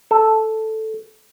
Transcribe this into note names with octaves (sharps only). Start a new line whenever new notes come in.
A4